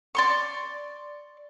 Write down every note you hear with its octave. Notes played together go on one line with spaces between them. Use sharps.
D5 C6 C#6